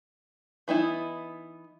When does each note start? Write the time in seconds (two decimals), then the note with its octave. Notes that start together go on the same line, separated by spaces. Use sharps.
0.68 E3 B3 D#4 E4